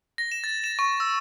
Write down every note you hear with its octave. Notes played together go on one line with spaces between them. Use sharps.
A#6
E7
A6
E7
C#6
E6